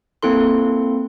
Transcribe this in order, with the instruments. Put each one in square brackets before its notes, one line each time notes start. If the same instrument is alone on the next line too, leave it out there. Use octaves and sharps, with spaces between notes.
[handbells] A#3 C4 E4 A4 C6